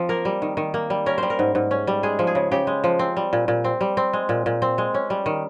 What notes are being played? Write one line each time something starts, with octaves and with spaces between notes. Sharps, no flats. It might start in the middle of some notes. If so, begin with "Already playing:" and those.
Already playing: F3 C4 D#4
A#3 A#4
G3
D#3
D#3
A#3
G3
C#4 A#4
G3 C5
A#4
G#2
G#2
C#4
G3
G#3 G#4
F3
G#4
C#3
C#3 G4
G#3
F3
C4
G3
A#2
A#2
C4
G3
C4
G#3
A#2
A#2
C4
G#3
C#4
G3
D#3